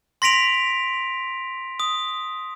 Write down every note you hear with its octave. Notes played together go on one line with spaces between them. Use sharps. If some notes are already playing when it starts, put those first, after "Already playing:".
C6 A#6 B6 D7 F7
D#6